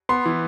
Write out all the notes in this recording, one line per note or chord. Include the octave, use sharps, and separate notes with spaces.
B3 C6
E3